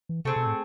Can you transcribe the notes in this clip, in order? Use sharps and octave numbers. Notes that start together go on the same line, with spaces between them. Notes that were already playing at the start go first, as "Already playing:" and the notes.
E3
C3 A3 C4 G#4
B2
A2